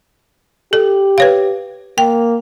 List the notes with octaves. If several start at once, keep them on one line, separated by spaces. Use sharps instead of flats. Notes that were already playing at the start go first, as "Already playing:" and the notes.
G4 A4
B4 C#5 F5
A#3 G5